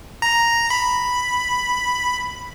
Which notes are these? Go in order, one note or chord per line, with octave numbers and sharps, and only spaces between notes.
A#5
B5